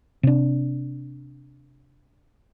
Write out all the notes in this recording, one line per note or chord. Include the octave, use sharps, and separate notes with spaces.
C3 D4